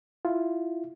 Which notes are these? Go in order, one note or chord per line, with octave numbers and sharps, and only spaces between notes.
E4 F4